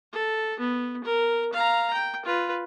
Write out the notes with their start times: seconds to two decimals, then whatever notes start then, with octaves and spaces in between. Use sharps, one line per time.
0.13 A4
0.60 B3
1.04 A#4
1.53 F5 A#5
1.93 G5
2.25 F4 B4